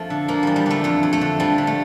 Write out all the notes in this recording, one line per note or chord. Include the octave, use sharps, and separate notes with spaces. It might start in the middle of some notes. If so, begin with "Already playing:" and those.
Already playing: F2 F3 A3 D4
D3
F3 A#3
E2 G3
G3
D3 A3
F2 A3
F2
A3
D3
F3 G3
D3
A3